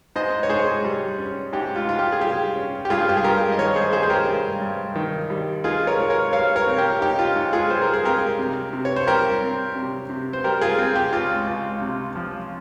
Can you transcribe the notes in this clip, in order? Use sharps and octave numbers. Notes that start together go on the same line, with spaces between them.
G#2 C5 D#5
C#5
G#2 G#4 C5
G3
C#4
G#2 G4
F4
G#2 F4
G4
G#4
G3 G4
C#4
G4
G2 F4 G#4
G4
G#4
G2 G4 A#4
D#5
D#3 A#4 C#5
G#4 C5
G3 G#4 C5
C5
G4 A#4
G2
G2
D#3
G3
D#4 F4 G#4
A#4 C#5
G#2
A#4 C#5
G3 C#5 F5
A#4 C#5
C4
G4 A#4
D#4 G4
F4
G#2
F4 G#4
G3 C5
A#4
G#4
C4 G4 A#4
C3
C3
C#5
C5
G3 G4 A#4
C4
C3
C3
C5
G3 G4 A#4
F4 G#4
C4
G4
C#2 F4
C#2
C3
F3